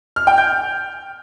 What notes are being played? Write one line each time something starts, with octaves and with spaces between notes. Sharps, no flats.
F6
G5
G6